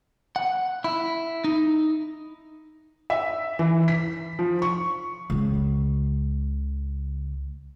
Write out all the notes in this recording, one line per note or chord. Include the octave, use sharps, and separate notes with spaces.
F#5
E4
D#4
E5
E3
B6
F3
C#6
C#2 C#3